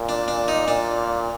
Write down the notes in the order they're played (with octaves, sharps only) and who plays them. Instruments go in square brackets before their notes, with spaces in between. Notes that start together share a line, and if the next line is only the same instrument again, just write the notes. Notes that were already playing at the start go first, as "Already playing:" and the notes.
Already playing: [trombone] A#2
[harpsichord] D4
D4
D#4
[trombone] A#2 [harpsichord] D4